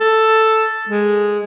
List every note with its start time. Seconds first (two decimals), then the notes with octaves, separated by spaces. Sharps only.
0.01 A4
0.89 G#3